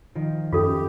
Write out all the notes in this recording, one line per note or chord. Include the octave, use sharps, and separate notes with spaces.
D#3 F3
F#2 F4 G4 A4 C#5